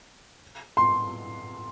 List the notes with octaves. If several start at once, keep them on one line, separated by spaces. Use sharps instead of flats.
C6